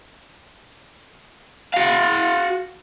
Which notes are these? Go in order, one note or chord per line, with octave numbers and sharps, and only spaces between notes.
F#4 F5